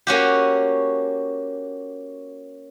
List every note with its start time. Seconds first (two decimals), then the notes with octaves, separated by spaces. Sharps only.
0.07 A#3 C#4 F#4 G4